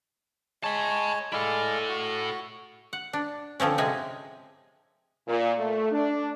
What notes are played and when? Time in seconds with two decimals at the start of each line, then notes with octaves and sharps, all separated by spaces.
0.63 G#3 C#5 A5 B5
1.33 G#3 E4 A4 D5 F5
1.88 F#4
2.93 F#5
3.13 D4
3.60 D3 F3 C4 C#4
3.78 C3 G#3 G#5
5.27 A#2
5.58 A3
5.92 D4